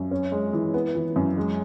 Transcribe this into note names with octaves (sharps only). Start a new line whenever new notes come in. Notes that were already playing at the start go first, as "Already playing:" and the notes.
Already playing: F#2
C#4
G#3
E3
B3
E3
F#2
G#3